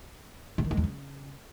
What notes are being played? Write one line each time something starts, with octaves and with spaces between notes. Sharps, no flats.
C3
D#3
G#3
E2
C#3